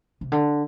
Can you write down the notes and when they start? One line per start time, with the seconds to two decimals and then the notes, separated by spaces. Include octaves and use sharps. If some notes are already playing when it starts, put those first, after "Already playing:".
0.21 C3
0.32 D3